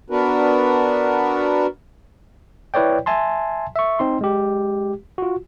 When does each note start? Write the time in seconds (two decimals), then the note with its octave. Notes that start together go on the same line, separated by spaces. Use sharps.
0.10 B3 D4 F#4 A#4 B4
2.74 E4 B4 C#5 D5 G5
3.06 E5 G#5 A5 C6
3.76 E5 C#6
3.99 C4 D#4 C6
4.21 G#3 G4
5.18 F4 F#4